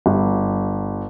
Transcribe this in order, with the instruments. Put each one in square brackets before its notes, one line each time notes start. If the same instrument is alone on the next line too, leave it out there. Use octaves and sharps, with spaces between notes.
[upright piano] G1